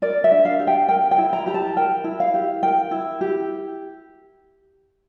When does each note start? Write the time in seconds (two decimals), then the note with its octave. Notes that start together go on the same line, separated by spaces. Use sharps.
0.02 A#4 D5
0.24 E5
0.32 D4
0.45 F5
0.59 G4
0.67 G5
0.88 A#4 G5
1.11 G5
1.18 E4
1.33 A#5
1.46 G4 A#5
1.54 A5
1.76 A#4 G5
2.04 E4
2.20 F5
2.34 G4
2.63 A#4 G5
2.91 E4
3.21 G4